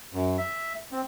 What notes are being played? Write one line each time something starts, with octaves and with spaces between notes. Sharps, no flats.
F#2
E5
C4